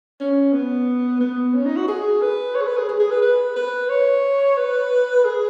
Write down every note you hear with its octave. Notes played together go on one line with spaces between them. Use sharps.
C#4
B3
B3
C#4
D#4
F#4
G#4
B4
C#5
G#4
B4
G#4
G#4
G#4
B4
B4
B4
C#5
B4
G#4